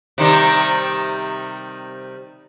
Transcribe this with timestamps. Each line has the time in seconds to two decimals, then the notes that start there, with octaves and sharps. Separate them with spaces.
0.18 C3 D#3 G3